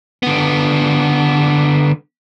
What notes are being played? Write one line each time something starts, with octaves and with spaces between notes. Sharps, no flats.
D3 B3